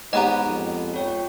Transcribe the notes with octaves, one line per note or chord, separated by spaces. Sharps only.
G#2 B3 D#4 G4 C#5 D#5 A#5 B5
F2
F4 C#5 G5